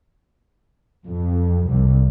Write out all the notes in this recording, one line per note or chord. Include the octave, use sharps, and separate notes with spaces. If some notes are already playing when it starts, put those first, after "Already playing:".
F2
C2